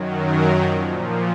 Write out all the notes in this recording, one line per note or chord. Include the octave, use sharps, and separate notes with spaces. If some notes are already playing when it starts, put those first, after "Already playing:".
Already playing: F#2 D#3 F#3
A#4
A#2 F3